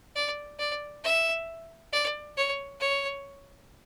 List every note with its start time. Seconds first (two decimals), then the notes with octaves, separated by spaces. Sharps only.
0.16 D5
0.59 D5
1.04 E5
1.93 D5
2.37 C#5
2.80 C#5